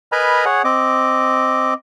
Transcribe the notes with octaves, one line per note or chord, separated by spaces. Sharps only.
A#4 B4 D#5 G#5 A#5 B5
G#4 C#5 F#5
C4 D#5 D6